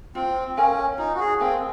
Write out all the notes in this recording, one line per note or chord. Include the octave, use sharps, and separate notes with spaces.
C4 F4
C#4 A#4 F5 G#5
D#4 F4
F#4
G#4
C4 A#4 F5 G#5